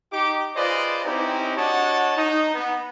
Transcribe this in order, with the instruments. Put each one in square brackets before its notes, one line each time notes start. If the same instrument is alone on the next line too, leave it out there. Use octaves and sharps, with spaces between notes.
[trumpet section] D#4 G4 D6
F4 G#4 B4 C5 D5 D#5
C4 C#4 D#4 E4 G4
D4 F#4 C#5 D#5 F#5 A5
D#4
B3